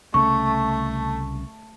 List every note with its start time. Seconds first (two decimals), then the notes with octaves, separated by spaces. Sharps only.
0.14 C2 C#3 A3 C#4 C#6